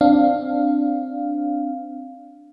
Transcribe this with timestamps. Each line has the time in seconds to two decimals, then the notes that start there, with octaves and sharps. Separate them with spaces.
0.01 C4 D4 F5